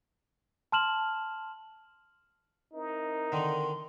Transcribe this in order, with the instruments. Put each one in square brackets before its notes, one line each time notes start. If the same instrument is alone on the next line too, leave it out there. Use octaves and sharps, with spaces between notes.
[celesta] A5 C6 F6 E7 F#7
[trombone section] C4 E4 A#4 [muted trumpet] D#4
[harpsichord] D3 D#3 [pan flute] C6